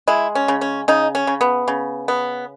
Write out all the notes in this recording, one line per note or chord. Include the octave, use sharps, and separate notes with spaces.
G#3 E4
C#4
C#3
C#4
C#3 D#4
C#4
C#3
B3
C#3
B3